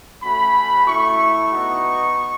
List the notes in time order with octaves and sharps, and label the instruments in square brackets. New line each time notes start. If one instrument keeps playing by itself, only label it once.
[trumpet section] A3 C#4 F#4 B5
A3 E4 C#6
B3 D#4 F#4